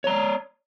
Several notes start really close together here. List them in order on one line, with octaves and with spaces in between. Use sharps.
C#5 A#5 D5